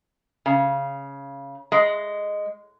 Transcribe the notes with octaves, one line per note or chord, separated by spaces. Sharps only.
C#3
G#3